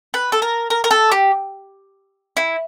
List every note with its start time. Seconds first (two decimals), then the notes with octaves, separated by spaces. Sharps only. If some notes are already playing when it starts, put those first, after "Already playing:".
0.14 B4
0.32 A4
0.42 A#4
0.70 A#4
0.84 A#4
0.91 A4
1.12 G4
2.37 E4